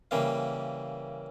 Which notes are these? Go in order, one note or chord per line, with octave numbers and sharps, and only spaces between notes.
C#3 E3 G3 A#3 F5